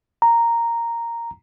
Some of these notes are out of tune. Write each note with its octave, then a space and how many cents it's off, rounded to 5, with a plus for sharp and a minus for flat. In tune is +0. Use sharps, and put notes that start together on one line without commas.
A#5 -5